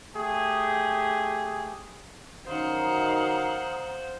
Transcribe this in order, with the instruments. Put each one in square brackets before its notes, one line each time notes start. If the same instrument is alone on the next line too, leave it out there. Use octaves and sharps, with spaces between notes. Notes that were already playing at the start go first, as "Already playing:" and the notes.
[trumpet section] A3 G4 G#4
[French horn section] F#2 D#3 [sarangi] C5 [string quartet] F5 F#5 [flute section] A#5 D#6